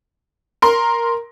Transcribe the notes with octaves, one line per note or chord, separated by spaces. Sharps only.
A#4 C6